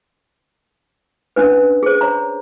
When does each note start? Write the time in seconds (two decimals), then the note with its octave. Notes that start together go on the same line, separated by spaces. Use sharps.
1.36 C#4 D4 B4
1.83 G#4 C5
2.01 C#5 A#5